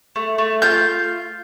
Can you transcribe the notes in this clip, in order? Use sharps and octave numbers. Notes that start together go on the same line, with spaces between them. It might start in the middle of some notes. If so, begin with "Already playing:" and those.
A3
A3
F4 G6